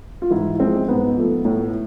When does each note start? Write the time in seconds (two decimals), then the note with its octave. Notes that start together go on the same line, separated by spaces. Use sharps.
0.22 F4
0.30 G#2 E3 E4
0.59 F3 G#3 C4
0.88 G#2 B3
1.17 F3 A3
1.45 A2